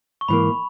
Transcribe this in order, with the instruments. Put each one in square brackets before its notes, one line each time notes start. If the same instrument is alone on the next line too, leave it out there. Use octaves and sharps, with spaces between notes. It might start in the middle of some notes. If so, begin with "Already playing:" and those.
[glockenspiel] C#6
[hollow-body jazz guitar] G#2 E3 A#3 [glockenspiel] B5